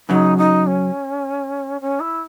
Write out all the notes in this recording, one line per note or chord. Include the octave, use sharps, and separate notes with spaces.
F#2 C#3 F#3 D#4
D#4
C#4
C#4
E4